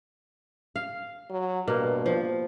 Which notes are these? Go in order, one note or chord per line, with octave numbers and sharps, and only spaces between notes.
F5
F#3
G2 B2 A#3
F3